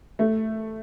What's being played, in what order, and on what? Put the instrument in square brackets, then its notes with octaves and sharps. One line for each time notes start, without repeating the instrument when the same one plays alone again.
[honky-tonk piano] A3